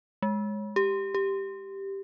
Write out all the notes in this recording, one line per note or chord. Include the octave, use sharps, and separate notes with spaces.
G#3
G4
G4